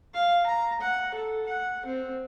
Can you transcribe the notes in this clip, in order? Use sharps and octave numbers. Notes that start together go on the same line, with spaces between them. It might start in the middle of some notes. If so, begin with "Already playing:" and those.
F5
A#5
F#5
A4
F#5
C4